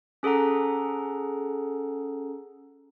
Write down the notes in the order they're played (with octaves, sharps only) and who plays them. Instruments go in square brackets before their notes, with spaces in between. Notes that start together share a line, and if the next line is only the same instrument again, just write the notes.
[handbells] C#4 G#4 A4 F#5 A#5